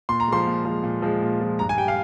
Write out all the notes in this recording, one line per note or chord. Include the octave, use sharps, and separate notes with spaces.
A#2 C6
A#5
F3 G#3 C6
A#2
F3 G#3
A#2
F3 G#3
A#2
F3 G#3
G2 A#5
G#5
G3 G5
F5